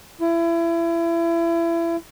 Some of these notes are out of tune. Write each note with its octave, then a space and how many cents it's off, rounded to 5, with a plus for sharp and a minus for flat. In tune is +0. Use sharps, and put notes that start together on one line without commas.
E4 +30